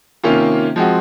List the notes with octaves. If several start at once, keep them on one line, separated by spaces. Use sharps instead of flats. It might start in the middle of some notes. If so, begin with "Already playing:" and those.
C3 D#3 A#3 C#4 F4
F3 G#3 C4 F#4